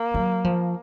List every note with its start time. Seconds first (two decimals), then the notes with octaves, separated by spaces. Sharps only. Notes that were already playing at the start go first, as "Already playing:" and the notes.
Already playing: A#3
0.14 F#3
0.44 F3